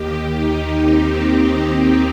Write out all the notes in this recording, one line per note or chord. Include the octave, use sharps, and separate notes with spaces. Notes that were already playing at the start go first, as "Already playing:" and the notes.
Already playing: D#2 D#3 G4
D#4
C4
D#4